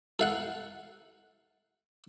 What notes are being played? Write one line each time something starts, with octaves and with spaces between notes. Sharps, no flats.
A4 F5 F#5